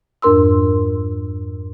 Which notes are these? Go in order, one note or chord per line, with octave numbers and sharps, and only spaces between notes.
F2 G#2 D4 A#4 C6 E6